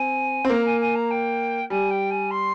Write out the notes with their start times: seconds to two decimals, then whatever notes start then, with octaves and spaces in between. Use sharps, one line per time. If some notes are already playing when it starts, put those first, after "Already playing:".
Already playing: C4 G#5
0.45 C4
0.50 A#3 A#5
0.65 G#5
0.80 G#5
0.95 A#5
1.10 G5
1.70 G3 G#5
1.90 G5
2.10 G#5
2.30 C6